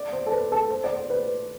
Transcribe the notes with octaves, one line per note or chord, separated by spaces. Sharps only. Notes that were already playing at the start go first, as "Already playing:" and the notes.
Already playing: D5
C5
A4
B4
A4
C5
D5
C5
B4